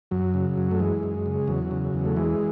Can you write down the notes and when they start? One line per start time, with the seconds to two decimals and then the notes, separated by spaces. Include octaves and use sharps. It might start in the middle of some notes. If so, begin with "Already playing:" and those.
0.11 F#2 F#3
0.34 C#3
0.57 F#2
0.71 A3
0.79 E3 G#3
1.03 F#2
1.26 C#3
1.48 E2 F#3
1.71 C#3
1.94 E2
2.05 A3
2.16 E3 G#3